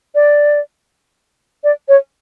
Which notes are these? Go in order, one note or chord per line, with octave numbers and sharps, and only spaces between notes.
D5
D5
C#5